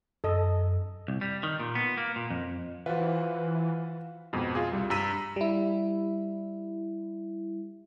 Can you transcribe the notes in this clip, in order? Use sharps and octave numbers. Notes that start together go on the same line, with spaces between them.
F#2 A4 D#5
C2
G3
D#3
A#2
B3
A#3
A#2
F2
E3 F4 F#4 B4 C5 F5 F#5
F2 G#2 B2
F4 G#4
C2 G3
G2 A#5 E6 B6 D#7
G3 E4